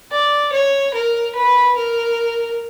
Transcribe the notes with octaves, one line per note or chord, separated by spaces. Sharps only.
D5
C#5
A#4
B4
A#4